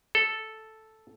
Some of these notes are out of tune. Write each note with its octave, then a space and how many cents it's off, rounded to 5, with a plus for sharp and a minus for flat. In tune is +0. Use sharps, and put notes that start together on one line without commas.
A4 -5